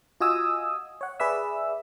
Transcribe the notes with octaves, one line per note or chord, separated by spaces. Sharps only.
F4 F#4 D#5 G#5 D#6 E6
C#5 F#5
G#4 B4 D5 E5 E6